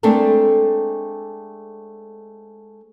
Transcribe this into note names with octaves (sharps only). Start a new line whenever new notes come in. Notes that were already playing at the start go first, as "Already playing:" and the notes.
G#3 A3 C4 D4 A4 A#4